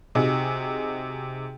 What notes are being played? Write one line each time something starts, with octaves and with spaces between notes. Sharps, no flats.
C3 D#4 F#4 G#4